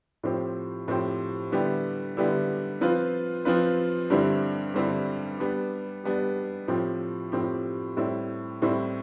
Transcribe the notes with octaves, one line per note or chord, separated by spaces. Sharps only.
A2 F3 C4 G4 C5
A2 F3 C4 G4 C5
D3 G3 B3 E4 G4
D3 G3 B3 E4 G4
F3 C4 F4 B4
F3 C4 F4 B4
G2 D3 G3 C4 E4
G2 D3 G3 C4 E4
G3 B3 D4 G4
G3 B3 D4 G4
A2 F3 C4 G4
A2 F3 C4 G4
A2 G3 C4 E4
A2 G3 C4 E4